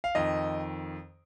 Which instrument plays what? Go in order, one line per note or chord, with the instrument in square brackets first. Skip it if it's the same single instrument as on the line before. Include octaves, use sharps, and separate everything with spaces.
[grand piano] F5
F2 D#3 D#5